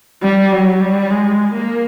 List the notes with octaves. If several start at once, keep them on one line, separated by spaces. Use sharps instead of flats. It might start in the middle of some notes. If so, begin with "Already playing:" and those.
G3
F#3
G3
G#3
A#3